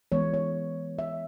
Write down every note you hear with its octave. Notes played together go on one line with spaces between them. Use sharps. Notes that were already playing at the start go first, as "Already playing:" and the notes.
E3 G#3 B3 C#5
C#5
E5